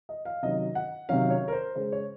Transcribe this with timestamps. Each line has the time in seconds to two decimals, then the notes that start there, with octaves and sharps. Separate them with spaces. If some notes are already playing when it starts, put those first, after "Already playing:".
0.09 D#5
0.25 F5
0.42 C3 D#3 F#3 C#4 D#5
0.75 F#5
1.09 C3 D#3 F#3 C#4 F5
1.30 C#5
1.48 A#4
1.52 C5
1.75 C#3 G#3 C#4 C5
1.92 C#5